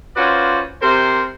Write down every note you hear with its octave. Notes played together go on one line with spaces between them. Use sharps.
C#4 F4 F#4 B4 C5 D5
C3 A#4 C5